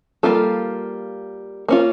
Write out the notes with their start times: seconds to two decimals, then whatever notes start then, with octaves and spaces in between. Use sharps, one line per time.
0.23 G3 A#3 C#4 F4 A4
1.68 A#3 C#4 F4